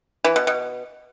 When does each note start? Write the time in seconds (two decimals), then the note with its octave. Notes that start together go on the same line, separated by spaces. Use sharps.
0.24 E3
0.36 B2
0.47 B2